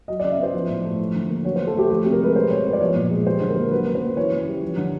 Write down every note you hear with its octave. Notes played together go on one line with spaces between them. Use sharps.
F#3 D#5
D5
C#3
E5
B3 C5
F3
A2
A3
F3
D3
A#3
F#3 C#5
C5
D3
A4
A3 G4
F3 G4
C3
A#4
G#3 B4
G3 C5
B2 C#5
B3
D5
F3 C#5
A#2
G#3
G3 C5
D3
A#4
A#3
F#3 B4
C#3
C5
A#3
E3 C#5
C#3
G3
F3
D3